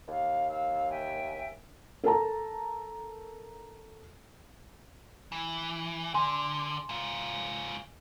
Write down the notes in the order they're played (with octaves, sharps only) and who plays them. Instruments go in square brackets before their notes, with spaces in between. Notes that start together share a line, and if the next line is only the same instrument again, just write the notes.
[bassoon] D#2 [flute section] F5
[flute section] F5 E6
E5 G5 G#5
[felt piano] A4 A#4 A5 A#5
[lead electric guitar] E3
[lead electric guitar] D3 [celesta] G#5 C6
[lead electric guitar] G#2 F4